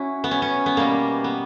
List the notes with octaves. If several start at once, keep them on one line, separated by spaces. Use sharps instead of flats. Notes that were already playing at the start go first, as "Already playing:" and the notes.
Already playing: C#4 E4 F#4
B3
C#4
C#4
B3
B2 G3 A#3
B3